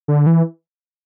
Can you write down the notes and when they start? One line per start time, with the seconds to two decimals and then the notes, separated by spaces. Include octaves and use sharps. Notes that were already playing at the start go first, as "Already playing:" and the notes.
0.08 D3
0.26 E3